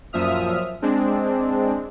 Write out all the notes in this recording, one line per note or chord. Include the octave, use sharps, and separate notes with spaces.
F#2 A#2 F3 E5 D#6 F6
G#3 C4 D4